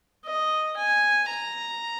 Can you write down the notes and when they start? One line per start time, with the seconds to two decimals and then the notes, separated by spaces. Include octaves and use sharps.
0.25 D#5
0.77 G#5
1.29 A#5